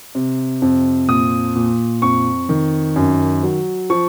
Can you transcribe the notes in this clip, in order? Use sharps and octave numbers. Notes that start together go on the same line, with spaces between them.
C3
F2
A#2 D#6
A#2
F2 C#6
D#3
F#2
F#3
F3 C#6